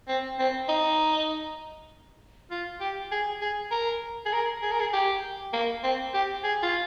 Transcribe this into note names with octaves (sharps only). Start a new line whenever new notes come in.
C4
C4
D#4
F4
G4
G#4
G#4
A#4
G#4
A#4
G#4
A#4
G#4
G4
A#3
C4
G4
G#4
F4